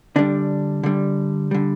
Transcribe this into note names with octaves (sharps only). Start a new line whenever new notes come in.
D3 G3 D4
D3 G3
D3 G3